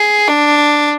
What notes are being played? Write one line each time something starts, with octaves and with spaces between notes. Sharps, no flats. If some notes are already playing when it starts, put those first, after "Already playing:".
Already playing: G#4
D4